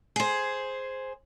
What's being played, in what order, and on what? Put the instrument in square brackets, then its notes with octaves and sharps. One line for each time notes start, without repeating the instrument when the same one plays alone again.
[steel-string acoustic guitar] G#4 C5